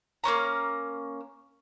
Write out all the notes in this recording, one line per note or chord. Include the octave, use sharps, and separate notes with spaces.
A#3 C4 C#4 A#5